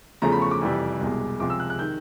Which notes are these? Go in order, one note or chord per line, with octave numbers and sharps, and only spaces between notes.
E2 C#3 F3 A3 A#5
B5
C#6
D6
F2 C3 E3 G3
C2 B2 G#3
C#2 C3 F3 G#3 D6
E6
F#6
F#6
D#3 G6